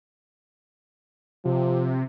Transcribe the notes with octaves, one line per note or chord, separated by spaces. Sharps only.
C3 F3